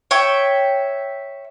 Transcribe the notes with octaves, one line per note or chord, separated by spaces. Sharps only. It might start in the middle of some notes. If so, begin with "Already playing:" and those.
C#5 E5 G5